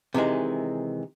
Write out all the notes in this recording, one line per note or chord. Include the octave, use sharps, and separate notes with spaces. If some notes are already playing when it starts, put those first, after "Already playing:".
C3 D#3 E3 G#3